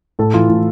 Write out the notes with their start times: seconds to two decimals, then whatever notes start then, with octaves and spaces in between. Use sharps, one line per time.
0.19 A2 A4
0.34 E3 F4
0.49 A2